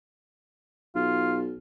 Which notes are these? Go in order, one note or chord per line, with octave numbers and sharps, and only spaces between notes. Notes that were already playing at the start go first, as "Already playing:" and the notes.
B1 F4